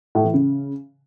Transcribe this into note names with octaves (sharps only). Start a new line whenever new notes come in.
A2
E3
C#3